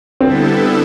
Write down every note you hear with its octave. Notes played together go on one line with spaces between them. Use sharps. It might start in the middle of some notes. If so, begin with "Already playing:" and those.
D3 G3 B3 C4 E4 A4